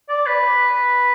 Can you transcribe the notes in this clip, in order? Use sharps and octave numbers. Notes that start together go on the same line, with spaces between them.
D5
B4